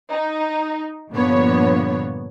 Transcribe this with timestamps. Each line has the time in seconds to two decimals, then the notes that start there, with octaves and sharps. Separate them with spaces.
0.12 D#4
1.12 G2 A#2 D3 F3 B3 C#5